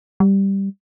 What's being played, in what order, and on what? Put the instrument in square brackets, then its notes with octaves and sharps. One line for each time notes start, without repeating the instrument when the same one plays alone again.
[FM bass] G3